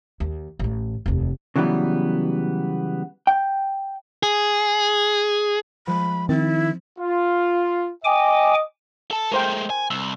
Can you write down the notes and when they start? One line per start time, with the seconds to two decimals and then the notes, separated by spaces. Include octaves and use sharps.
0.20 D#2
0.59 A1 A2
1.06 F1 D#2
1.56 C#3 E3 F#3 G3 B3
3.27 G5
4.23 G#4
5.87 F3 G#3 B5
6.29 D#3 C4 E4 A6
6.99 F4
8.04 D#5 G5 G#5 D6
9.11 A4 A5
9.32 G#3 A3 A#4 C5 G5
9.70 G#5
9.90 C2 E6